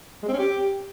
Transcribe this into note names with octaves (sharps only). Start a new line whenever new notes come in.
G#3
C4
C#4
G4